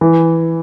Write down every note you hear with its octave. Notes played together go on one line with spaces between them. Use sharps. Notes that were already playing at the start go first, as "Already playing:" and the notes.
E3